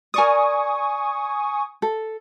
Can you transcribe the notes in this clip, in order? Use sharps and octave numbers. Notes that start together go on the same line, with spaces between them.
A#4 D5 G#5 C#6 D#6
A4